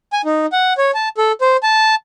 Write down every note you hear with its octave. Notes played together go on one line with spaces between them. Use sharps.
G#5
D#4
F#5
C#5
A5
A4
C5
A5